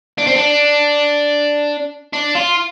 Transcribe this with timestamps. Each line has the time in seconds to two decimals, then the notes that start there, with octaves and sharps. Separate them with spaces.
0.18 D4
0.27 C4
0.36 D4
2.13 D4
2.35 F4